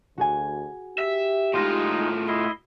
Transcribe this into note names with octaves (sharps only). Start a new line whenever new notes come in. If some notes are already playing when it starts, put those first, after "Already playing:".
D2 F#4 G#4 G#5
G4 E5
A2 G#3 D#4 F4 C6 F#6 A#6
E4 D#5 C6